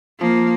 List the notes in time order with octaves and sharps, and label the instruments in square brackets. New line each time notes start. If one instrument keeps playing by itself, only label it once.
[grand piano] F3 [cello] A#3